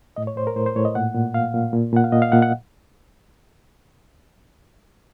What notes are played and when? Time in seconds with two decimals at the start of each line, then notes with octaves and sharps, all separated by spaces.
0.16 A2 D#5
0.27 C#5
0.36 A2 C5
0.47 A#4
0.56 A2 C5
0.66 C5
0.76 A2 C#5
0.85 D#5
0.95 A#2 F#5
1.15 A#2
1.34 A#2 F5
1.54 A#2
1.73 A#2
1.92 A#2 F#5
2.04 F5
2.12 A#2 D#5
2.22 F5
2.32 A#2 F#5
2.42 F#5